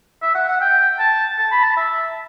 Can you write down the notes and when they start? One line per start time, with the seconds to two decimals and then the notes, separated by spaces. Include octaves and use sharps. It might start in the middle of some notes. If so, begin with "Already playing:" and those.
0.22 E5
0.35 F#5
0.48 F#5
0.61 G5
0.99 A5
1.38 A5
1.51 B5
1.63 A5
1.77 E5